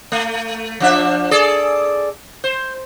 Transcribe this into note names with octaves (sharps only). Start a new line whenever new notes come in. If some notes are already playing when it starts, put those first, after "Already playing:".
A3
F3 D4 E5
G#4 A4 D5
C5